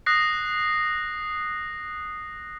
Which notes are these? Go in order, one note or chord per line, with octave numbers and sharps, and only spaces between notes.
D#6 F#6 A#6 C7